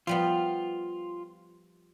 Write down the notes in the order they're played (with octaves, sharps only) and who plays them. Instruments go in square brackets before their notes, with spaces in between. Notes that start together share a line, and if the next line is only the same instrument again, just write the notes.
[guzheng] F3 G3 B3 [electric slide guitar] F4